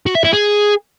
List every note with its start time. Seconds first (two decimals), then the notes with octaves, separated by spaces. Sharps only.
0.06 F#4
0.15 E5
0.24 E4
0.33 G#4